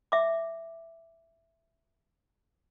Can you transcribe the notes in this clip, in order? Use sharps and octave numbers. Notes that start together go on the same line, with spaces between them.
E5 D6